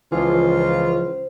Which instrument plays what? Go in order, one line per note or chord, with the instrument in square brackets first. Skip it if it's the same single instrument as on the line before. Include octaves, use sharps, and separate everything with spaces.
[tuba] C#2 [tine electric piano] E3 F3 [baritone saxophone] F4 [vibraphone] C5